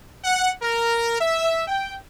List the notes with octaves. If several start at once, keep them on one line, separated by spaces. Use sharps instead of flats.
F#5
A#4
E5
G5